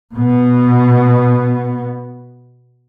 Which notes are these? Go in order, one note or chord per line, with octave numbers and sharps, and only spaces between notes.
B2 B3